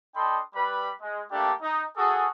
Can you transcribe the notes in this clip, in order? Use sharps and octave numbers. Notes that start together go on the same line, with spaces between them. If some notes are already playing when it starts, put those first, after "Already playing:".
D4 A4 D#5 G5 B5 C6
G3 B4 B5
G#3
G3 A3 A#3 D4 G4 A4
D#4
F#4 G#4 A4